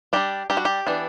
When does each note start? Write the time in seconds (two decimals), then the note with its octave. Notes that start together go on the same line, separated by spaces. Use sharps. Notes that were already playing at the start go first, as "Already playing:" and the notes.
0.13 G3 D4 G4
0.50 G3 D4 G4
0.57 F#4
0.65 G4
0.87 E3 B3 D4